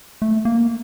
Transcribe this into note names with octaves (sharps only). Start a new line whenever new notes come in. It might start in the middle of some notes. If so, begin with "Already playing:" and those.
A3
A#3